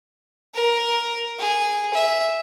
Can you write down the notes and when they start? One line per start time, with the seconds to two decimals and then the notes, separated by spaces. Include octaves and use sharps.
0.54 A#4
1.39 G#4
1.94 E5